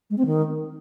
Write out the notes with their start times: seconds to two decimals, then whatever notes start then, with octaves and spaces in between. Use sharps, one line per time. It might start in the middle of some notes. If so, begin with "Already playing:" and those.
0.10 G#3
0.18 C4
0.25 D#3